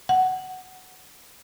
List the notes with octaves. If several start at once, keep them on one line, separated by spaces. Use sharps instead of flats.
F#5